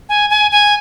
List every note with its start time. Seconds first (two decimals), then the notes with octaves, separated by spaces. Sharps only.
0.09 G#5
0.30 G#5
0.51 G#5